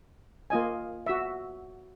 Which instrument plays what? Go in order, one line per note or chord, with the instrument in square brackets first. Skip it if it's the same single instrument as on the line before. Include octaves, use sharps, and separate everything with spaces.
[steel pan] A#3 F4 D#5 G#5
F#4 E5